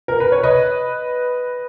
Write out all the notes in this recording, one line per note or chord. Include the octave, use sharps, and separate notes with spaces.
A#4
B4
C#5
B4 D#5